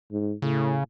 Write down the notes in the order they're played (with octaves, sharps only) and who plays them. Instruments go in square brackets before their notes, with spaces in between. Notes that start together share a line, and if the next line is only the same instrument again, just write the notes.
[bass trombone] G#2
[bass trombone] A2 [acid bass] C#3